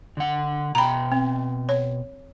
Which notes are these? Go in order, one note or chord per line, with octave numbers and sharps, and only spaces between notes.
D3 F#5
B2 G5 A#5 B5
C4
C#5